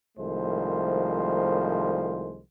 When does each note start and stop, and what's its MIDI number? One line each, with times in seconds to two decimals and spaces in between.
0.18 2.41 36
0.18 2.41 51
0.18 2.41 53
0.18 2.41 56
0.18 2.41 57
0.18 2.41 72